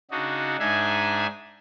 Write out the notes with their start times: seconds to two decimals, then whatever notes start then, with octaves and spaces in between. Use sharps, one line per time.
0.11 C#3 D4 D#4 F#4
0.59 G#2 D4 D#4 G#4 E5 G#5